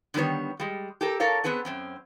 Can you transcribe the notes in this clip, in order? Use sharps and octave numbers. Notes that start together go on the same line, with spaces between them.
D3 D#3 G3 B3 C#5
G3 G#3
G4 A4 A#4
A4 A#4 C#5 F5
B3 C4 G#4 B4 F#5
F#2 C4 C#4